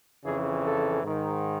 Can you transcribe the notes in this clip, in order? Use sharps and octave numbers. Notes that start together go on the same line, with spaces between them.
F2 C#3 E3 G#4
A4
G#2 D#3